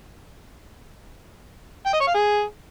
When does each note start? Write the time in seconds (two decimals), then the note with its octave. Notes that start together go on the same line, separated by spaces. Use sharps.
1.86 G5
1.93 D#5
2.00 C#5
2.07 F5
2.14 G#4